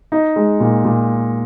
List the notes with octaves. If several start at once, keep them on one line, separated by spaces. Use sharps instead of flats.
D#4
G#3
A#2
A#2